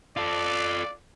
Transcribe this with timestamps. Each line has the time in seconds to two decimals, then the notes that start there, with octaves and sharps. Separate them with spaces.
0.17 F4 A4 D5